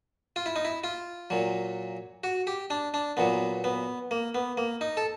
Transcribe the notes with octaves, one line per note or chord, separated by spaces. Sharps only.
F4
E4
D#4
E4
F4
A#2 F#3
F#4
G4
D4
D4
A#2 F#3 B3
B3
A#3
B3
A#3
D#4
A4